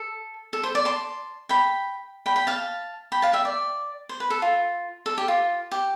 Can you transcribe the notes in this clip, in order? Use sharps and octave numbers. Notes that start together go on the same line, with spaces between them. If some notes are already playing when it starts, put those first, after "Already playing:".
Already playing: A4
A4
C5
D5
A5 C6
G5 B5
G5 B5
G5 B5
F5 A5
G5 B5
F5 A5
E5 G5
D5
C5
B4
A4
F4
A4
G4
F4
G4